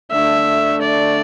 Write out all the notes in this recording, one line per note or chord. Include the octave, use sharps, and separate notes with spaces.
D3 A3 D4 E5
D5